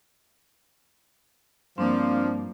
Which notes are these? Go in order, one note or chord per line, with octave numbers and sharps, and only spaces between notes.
G2 F3 A#3 C4 D4 D5